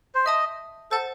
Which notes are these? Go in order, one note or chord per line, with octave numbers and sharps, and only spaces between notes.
C5
D#5 E5 A5 D#6
A4 C5 F#5 A5